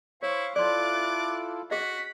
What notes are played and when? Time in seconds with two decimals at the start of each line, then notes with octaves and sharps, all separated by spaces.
0.23 E4 C5 C#5 F5 C#6
0.56 E4 F4 A4 D5 C6 D6 F#6 A6
1.71 F#4 G#4 D#5 B6